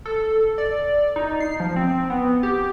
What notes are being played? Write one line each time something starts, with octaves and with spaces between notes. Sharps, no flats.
A4
D5
D#4
C7
F3
C4
B3
G4